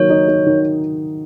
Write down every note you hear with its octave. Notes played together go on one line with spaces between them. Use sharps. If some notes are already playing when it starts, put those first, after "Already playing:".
Already playing: D#3 F#3 A#3 C#5
D#4
D#4
D#3